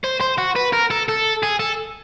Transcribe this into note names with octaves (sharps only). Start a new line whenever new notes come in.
C5
C5
F#4
B4
A#4
A4
A4
G#4
A4